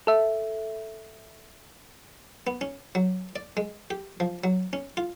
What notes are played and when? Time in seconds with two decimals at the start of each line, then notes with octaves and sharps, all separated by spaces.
0.07 A4 E5
2.47 B3
2.61 C#4
2.95 F#3
3.36 D5
3.57 G#3
3.91 G4
4.20 F3
4.44 F#3
4.73 C#4
4.97 F4